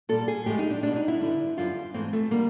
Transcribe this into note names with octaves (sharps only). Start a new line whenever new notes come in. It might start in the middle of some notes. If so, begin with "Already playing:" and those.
A#2 G3 A4
G#4
A2 F3 G#3 G4
D#4
D4
B2 G3 D4
D#4
E4
G2 D3 G3
F#2 D3 G3 F4
G#2 E3 A3 C4
A3
D3 G3 A#3